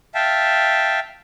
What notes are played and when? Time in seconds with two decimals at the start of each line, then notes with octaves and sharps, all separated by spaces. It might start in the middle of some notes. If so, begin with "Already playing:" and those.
0.15 E5 F5 G5 A5